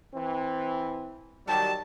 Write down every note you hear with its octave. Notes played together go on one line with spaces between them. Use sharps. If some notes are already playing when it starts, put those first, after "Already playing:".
E3 C4
D#3 F#3 G3 A5